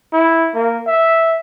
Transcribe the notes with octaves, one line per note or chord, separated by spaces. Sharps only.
E4
A#3
E5